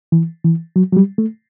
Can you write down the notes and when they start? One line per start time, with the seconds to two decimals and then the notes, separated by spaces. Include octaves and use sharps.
0.12 E3
0.44 E3
0.76 F#3
0.93 F#3
0.97 G3
1.18 A3